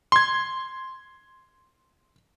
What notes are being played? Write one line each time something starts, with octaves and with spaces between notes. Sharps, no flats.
C6 G#6